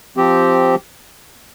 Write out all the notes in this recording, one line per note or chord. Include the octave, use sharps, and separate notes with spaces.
F3 C4 G4